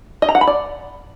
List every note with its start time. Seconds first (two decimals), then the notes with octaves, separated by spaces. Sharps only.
0.22 D#5
0.29 A#5
0.35 F#5
0.41 B5
0.47 D5